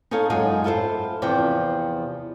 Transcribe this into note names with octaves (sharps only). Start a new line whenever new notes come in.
D#4 G#4 A4 C#5 F5
F#2 G#3 D#4 F4 G#5
E4 F4 A4 A#4 C5
E2 C3 F3 G5